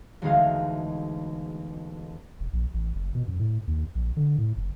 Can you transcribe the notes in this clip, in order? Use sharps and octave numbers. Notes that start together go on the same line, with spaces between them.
E1 D2 G#3 D#4 G#4 F5
E1
A#1
A1
F#1
B2
F#2
A2
D#2
A#1
D3
A2
F#1